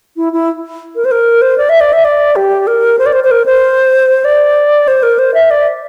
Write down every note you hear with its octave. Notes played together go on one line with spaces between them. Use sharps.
E4
E4
A#4
C5
A#4
C5
D5
E5
D5
E5
D5
G4
A#4
C5
D5
C5
C5
A#4
C5
D5
C5
A#4
C5
E5
D5